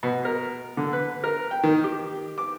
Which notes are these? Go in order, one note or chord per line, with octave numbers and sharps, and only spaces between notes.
B2
A#4
D3
B4
A#4
G5
D#3
G4
D6